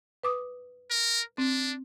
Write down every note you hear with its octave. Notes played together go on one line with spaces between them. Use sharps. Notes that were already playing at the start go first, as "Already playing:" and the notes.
B4 D6 D#6
A#4
C4 D4